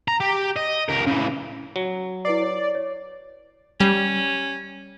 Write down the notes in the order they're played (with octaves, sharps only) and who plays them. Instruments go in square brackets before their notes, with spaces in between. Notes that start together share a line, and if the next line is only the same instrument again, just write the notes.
[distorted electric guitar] A#5
G4
D#5
C#2 A#4
C#3 E3
[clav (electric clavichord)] F#3
[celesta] E4 B4 C7 [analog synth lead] D5
[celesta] C#5
C#5
[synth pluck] G3 [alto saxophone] C#4